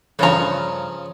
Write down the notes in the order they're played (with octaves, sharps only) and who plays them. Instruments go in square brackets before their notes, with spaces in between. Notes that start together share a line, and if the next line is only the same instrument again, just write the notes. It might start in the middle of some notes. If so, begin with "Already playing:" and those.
[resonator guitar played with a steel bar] G2 A#5 [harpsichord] C#3 F3 C#4